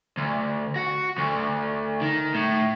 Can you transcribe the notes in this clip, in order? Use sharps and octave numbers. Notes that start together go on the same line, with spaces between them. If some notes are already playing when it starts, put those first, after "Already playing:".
D2
F#4
D2
D#3
A2